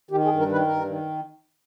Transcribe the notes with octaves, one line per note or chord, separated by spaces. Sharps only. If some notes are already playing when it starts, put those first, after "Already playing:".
D#3 G4
G#4
G2
A#4
D#3 B4
G2 A#4
D#3